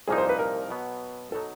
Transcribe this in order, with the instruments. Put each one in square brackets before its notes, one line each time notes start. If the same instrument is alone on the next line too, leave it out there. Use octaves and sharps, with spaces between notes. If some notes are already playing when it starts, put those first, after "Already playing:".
[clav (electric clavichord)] C2 A#2 F3 A#3 D#4 [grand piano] G#4
[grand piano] C5
B4
A#4
[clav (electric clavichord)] B2 F#3 B3
[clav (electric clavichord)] B2 F#3 B3 D#4 [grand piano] A4